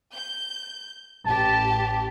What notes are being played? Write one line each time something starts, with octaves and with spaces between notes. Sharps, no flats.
G6
A1 G4 A5